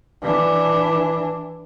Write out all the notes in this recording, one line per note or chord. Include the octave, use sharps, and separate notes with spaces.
E3 D4